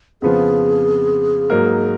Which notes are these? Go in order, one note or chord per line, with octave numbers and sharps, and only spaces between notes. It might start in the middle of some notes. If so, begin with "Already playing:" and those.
F2 C#3 F3 B3 F4 G#4
G#2 F#3 A#3 D#4 A#4